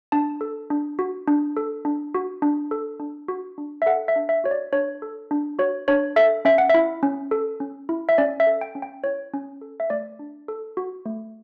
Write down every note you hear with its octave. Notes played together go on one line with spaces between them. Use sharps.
D4 A5
A4
D4
F#4
D4
A4
D4
F#4
D4
A4
D4
F#4
D4
E5
A4 F#5
E5
D4
E5
F#4 C#5
D5
D4 C#5
A4
D4
F#4 C#5
D4 C#5
A4 E5
C#4 E5
F#5
E4 E5
C#4
A4
C#4
E4
E5
C#4 D5
E5
A4
G5
C#4
G5
E4 C#5
C#4
A4
E5
A3 D5
D4
A4
F#4
A3